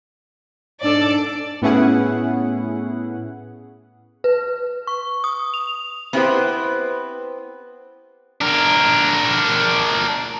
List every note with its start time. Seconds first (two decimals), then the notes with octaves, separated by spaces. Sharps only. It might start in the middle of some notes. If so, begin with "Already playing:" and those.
0.83 G#2 D4 A4 D5
1.62 A2 B3 C#4 E4 G#4 F#5
4.24 B4
4.87 C#6
5.24 D#6
5.54 F7
6.13 B3 C4 E4 G4 B4 C5
8.41 D4 A#4